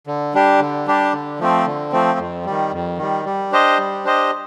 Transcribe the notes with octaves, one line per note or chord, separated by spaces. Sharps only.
D3
G3 D4 G4
D3
G3 D4 G4
D3
F3 A3 C4
D3
F3 A3 C4
F2
D#3 G3
F2
D#3 G3
G3
D4 G4 C5 D#5
G3
D4 G4 C5 D#5